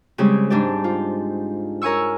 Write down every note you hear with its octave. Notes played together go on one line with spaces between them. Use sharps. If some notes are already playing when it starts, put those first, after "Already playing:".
C#3 G3 G#3 C4 G4
G#2 D4 G4 D5
F4
A#4 C#5 G#5 C#6 E6